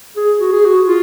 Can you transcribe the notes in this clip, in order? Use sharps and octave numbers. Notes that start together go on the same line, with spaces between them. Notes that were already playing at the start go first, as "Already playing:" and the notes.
G#4
F#4
G#4
F#4
F4